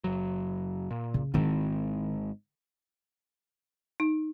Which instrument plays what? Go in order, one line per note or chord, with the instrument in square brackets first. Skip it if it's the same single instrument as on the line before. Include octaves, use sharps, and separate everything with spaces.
[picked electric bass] F#1 F#3
A#2
[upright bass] C#3
[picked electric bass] G#1 G#2 C4 [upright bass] D#3 E4
[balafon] D#4